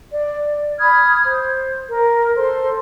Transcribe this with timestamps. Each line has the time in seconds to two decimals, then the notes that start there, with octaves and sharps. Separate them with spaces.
0.12 D5
0.79 B5 D#6 F6 G#6
1.24 C5
1.90 A#4
2.37 A4 C5 C6